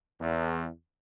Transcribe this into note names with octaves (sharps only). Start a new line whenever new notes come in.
E2